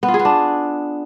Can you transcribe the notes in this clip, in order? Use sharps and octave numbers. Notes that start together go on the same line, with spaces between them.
B3
F4
G#4
B3
D4